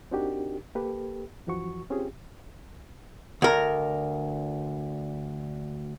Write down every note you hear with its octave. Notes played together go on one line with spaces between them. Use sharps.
C4 D4 D#4 F#4 G4 A#4
A#3 G4 A4 B4
F#2 E3 F3 F#4 C#6
C4 C#4 F4 G4 G#4
D2 A#4